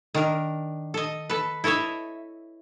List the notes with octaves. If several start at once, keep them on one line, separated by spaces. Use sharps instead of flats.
D#3 D4 A#4
A4 D#5
A4 B4
E4 A4 C#5 D#5 E5